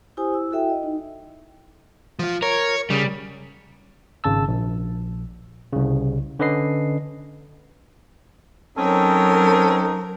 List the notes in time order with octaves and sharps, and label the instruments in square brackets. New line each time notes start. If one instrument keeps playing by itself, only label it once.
[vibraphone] E4 G4 C5 G#5 D#6
E4 E6
E4 F#4 A4 E5 G5
D#5
D#4
[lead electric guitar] F3 F4
[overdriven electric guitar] A#4 [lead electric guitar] C#5
[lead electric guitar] C#3 [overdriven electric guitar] G3
[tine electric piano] G#1 C#3 A5 E6
A#1
C2 C#3
D3 C#4 B4 D#5 C7
[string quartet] F#3 A#4 [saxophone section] C4 C#4 [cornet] D#4 [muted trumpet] A4